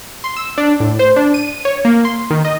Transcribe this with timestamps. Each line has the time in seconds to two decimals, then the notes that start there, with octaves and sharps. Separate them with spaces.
0.24 C6
0.36 E6
0.58 D4
0.80 A2
0.99 C5
1.16 D4
1.34 D#7
1.65 C#5
1.85 A#3
2.05 C6
2.30 D#3
2.45 D#5